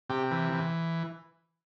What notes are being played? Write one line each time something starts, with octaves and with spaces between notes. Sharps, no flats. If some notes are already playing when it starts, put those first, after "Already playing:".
C3 G4
E3
E3